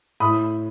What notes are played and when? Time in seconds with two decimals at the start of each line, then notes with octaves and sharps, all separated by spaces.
0.20 A2 B5 D#6